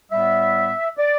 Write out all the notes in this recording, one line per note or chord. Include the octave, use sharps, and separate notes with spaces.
A2 G3 B3 E5
D5